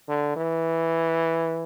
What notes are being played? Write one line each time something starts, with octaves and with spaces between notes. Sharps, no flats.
D3
E3